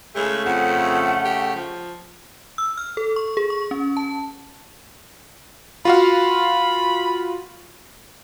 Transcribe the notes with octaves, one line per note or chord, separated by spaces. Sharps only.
C#3 G#3 A3
F2 F#5
G4
F3
E6
F6
A4
C#6
G#4
C#6
C#4
A5
F4 F#4 F5 B5